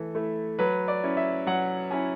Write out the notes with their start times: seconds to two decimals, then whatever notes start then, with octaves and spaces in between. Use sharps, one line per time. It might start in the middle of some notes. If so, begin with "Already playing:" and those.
Already playing: E3 A3 A4
0.15 A3 E4
0.59 F#3 B4
0.88 D5
1.03 C#4 E4
1.17 E5
1.46 F#3 F#5
1.91 C#4 E4 G#5